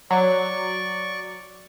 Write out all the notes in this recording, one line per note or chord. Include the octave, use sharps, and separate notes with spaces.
F#3 D5 C#6